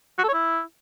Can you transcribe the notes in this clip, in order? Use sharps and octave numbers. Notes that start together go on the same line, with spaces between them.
F#4
A4
C#5
E4